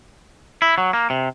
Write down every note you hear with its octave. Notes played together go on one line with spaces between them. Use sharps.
E4
F#3
A#3
C3